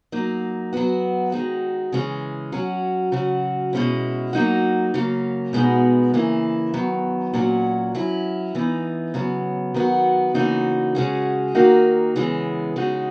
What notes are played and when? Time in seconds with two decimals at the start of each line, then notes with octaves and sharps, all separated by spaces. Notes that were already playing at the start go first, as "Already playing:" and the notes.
0.12 F#3 A#3 D#4
0.73 F#3 B3 F#4
1.32 D#3 G#3 D#4 F#4
1.92 C#3 E3 G#3 C#4
2.52 F#3 C#4 F#4
3.12 C#3 F#3 C#4 F#4
3.73 B2 G#3 C#4 E4
4.33 F#3 A#3 D#4 F#4
4.94 C#3 F#3 A#3 C#4
5.53 B2 G#3 B3 D#4 F#4
6.14 C#3 E3 A#3 E4
6.74 D#3 F#3 B3
7.33 A#2 F#3 C#4 F#4
7.95 F#3 C#4 E4
8.55 E3 B3 D#4
9.14 C#3 F#3 B3
9.74 D#3 F#3 B3 F#4
10.34 C#3 E3 A#3 D#4 F#4
10.95 C#3 G#3 C#4 F#4
11.55 D#3 A#3 D#4 F#4
12.16 C#3 E3 G#3 B3
12.76 C#3 G#3 D#4 F#4